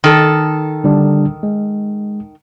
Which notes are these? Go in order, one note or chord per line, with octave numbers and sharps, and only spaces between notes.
D#3 A4
D3 G3 D4
G#3